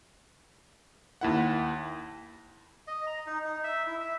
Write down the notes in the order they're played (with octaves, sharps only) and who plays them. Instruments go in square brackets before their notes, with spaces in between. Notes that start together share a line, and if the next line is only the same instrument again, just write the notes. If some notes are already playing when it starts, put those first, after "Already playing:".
[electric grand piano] D#2 E4 F#5
[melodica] D#5
A#5
D#4
D#4
E5
E4
E5